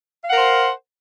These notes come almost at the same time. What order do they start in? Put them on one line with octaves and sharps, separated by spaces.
F5 F#5 A#4 C5